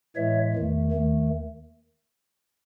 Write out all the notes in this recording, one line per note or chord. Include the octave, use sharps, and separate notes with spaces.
A2 E3 G#3 C#5 E5
E2 D#3 A3
D#2 D#3 A3